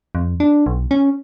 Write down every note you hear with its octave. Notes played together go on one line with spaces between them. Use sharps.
F2
D4
B1
C#4